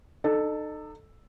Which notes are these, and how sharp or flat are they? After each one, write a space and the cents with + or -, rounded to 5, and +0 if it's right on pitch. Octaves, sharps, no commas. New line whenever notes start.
D#4 -35 A4 +0